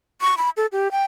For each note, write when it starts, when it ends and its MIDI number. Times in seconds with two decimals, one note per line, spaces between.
0.21 0.35 85
0.38 0.50 83
0.57 0.66 69
0.72 0.91 67
0.91 1.05 79